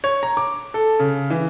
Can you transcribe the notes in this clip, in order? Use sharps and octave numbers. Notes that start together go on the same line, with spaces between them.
C#5
A#5
D6
A4
C#3
E3